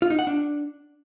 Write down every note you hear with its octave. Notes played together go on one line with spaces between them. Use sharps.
F4
D#4
F#5
D4